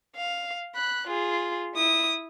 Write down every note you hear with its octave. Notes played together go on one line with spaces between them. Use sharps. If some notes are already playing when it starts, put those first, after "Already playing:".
F5
B5 F#6
F4 G#4
E4 D#6